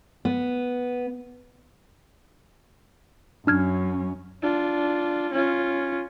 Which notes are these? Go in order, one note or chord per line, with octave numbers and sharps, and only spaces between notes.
B3
F#2 C#4 D4 F6 G#6
D4 F4
C#4 F4